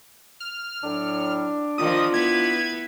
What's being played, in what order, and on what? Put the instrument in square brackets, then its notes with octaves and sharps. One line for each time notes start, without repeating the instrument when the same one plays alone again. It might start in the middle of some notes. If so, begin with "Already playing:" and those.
[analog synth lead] F6
[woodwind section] A2 F#3 [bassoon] D4
[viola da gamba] D#3 F3 [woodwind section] F4 [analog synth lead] D#6
[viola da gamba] B3 E4 B4 [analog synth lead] G#6